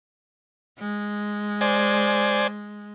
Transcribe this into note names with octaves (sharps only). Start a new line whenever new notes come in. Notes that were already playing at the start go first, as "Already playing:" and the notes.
G#3
C5 D5 G#5